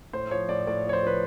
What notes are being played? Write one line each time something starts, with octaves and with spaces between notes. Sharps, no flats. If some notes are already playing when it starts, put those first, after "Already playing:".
A2 C5
F3 C#5
A2 D5
A2 D5
F3 C#5
C5
F3 B4